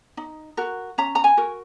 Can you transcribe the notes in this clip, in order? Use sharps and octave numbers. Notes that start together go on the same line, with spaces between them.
D#4
F#4 A#4
C#4 A#5
A#5
G#5
F#4 A#4